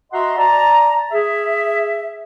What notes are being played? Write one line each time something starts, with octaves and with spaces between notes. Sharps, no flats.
F#4 D#5 E5 F#5 A#5 C6
D5 A5 A#5
G#4 E5